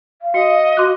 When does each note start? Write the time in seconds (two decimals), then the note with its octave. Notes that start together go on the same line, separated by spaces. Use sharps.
0.22 F5
0.34 F#4 D#5 C#7
0.77 F#4 C6 D6 F#6